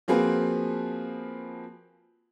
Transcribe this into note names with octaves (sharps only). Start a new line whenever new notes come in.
F3 A#3 C4 F#4 G#4 B4